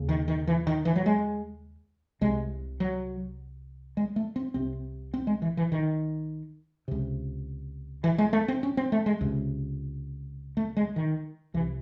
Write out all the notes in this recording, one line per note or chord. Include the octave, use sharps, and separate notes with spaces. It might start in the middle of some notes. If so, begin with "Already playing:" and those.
Already playing: D#2 C#3
D#3
D#3
E3
D#3
E3
F#3
G#3
C2 C3 G#3
F#3
G#3
A3
C4
C2 C3 C4
C4
G#3
E3
E3
D#3
C#2 C3
E3
G#3
A3
C4
C#4
C4
A3
G#3
C#2 C3
A3
G#3
D#3
C2 C3 E3